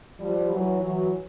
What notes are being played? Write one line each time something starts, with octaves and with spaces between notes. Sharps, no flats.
F3 G3
E3 F#3
E3 F#3